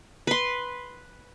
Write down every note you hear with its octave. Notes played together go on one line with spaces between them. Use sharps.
B4 C6